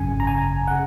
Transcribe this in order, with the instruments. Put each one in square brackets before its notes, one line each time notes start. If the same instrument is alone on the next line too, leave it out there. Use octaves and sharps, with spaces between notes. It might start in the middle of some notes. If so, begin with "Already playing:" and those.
Already playing: [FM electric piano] G#1 F#2 C#3 G#5
A#5
G#5
C#3 F#5